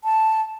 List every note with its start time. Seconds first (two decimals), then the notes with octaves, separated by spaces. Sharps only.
0.04 A5